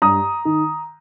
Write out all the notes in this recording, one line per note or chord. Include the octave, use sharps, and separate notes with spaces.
G2 A#5 D#6
D#3